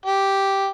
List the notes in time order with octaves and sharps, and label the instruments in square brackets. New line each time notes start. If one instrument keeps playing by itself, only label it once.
[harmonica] G4